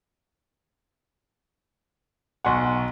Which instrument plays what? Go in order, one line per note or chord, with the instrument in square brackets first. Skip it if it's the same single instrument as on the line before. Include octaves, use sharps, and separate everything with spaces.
[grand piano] B1 C#6 [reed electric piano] F#5 G#5 C6